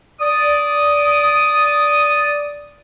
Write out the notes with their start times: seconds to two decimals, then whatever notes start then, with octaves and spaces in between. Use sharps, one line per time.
0.20 D5 D#6